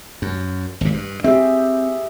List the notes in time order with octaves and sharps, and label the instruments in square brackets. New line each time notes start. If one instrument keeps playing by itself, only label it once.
[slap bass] F#2
G#1 A#2
G2
[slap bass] C4 [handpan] G4 G#4 E5